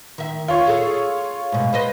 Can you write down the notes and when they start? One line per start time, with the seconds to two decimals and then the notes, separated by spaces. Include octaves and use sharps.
0.18 D#3 E5
0.48 F4 C#5
0.67 G#4 A4 F5
1.52 G#2 B2
1.73 B3 C5 D#5